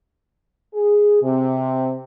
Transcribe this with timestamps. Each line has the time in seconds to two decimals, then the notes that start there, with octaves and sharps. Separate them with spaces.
0.74 G#4
1.22 C3